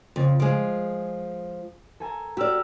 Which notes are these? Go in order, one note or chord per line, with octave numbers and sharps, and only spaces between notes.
F2 C#3 A6
F3 G#3 G#4 D7
A4 G#5 A#5
F#4 G4 D5 E6 F6